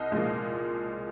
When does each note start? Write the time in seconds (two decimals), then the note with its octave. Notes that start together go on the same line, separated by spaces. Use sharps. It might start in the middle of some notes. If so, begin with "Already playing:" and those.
Already playing: C2 D#5
0.12 A#2 F3 G#3